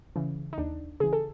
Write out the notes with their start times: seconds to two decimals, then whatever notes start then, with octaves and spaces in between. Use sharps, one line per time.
0.16 C#3 E3
0.53 D#4
0.58 D#2 D4
1.00 C#3 E3 G#4
1.13 A4